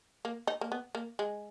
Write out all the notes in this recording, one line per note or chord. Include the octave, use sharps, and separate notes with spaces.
A#3
D#4
A#3
B3
A#3
G#3